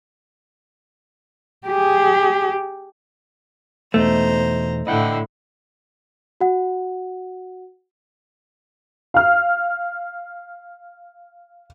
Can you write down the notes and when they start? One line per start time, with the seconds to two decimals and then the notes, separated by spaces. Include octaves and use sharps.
1.67 G4 G#4
3.94 E2 B2 A3 D#4 C5 A#5
4.87 A2 D3 E4 D#5 F#5 G5
6.41 F#4 F#5
9.14 F5 F6